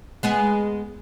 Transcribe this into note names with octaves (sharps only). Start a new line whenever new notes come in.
G#3 B3 G#4